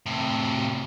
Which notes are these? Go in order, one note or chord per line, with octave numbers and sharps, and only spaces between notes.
A2 C3